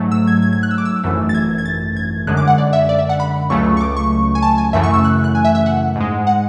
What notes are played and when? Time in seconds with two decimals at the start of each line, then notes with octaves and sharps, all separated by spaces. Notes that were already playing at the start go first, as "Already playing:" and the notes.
Already playing: G#2 F#3 A3
0.12 E6
0.27 G#6
0.42 G#6
0.53 G#6
0.63 F#6
0.71 E6
0.78 D6
0.85 E6
1.04 G#1 F#2 E3 A3
1.29 A6
1.34 G#6
1.58 G#6
1.65 A6
1.97 G#6
2.27 F#2 D3 G#3 F#6
2.37 D6
2.47 F#5
2.58 D5
2.73 E5
2.89 D5
2.99 E5
3.09 F#5
3.20 B5
3.50 C#2 C#3 F#3 A3 C#6
3.77 C#6
3.81 D6
3.97 C#6
4.35 G#5
4.42 A5
4.58 G#5
4.73 F#2 C#3 E3 A3 E5
4.83 C#6
4.94 E6
5.04 F#6
5.24 F#6
5.35 G#5
5.45 E5
5.55 E5
5.66 F#5
5.96 G#2 G#3
6.27 F#5